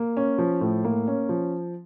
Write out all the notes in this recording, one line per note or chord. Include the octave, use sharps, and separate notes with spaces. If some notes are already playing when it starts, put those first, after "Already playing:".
Already playing: A#3
C#4
F3
A2
A#3
C#4
F3